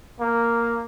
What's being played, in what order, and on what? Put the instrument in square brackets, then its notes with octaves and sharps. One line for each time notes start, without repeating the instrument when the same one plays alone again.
[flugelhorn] A#3